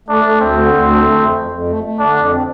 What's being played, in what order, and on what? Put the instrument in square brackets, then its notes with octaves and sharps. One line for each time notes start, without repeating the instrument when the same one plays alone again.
[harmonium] A3 [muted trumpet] D4
[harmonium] A3
[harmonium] D2 [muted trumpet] C4
[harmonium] D3
D2
A3
A3
F2
F2
F2
A3
A3
[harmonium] D3 [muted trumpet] D4
[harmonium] F2
C4